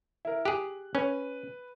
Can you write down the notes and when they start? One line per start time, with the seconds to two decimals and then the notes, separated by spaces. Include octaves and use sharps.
0.25 E4 A#4
0.45 G4 G#4 F#6
0.95 C#4 B4